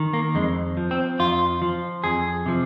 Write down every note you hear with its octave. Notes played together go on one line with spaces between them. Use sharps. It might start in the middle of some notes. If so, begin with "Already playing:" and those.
Already playing: D#3
A#3
F2 G#3
F3
C4
F2 F4
F3
F2 G#4
C3 F3